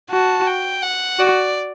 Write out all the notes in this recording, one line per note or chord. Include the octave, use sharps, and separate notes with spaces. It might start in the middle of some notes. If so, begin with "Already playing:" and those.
F#4 A5
G5
F#5
F#4 D5